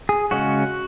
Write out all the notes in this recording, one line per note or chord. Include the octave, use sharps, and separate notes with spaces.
G#4
C#3 G#3 C#4 F#4